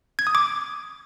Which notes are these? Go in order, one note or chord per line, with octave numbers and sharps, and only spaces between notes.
G#6
D#6
D6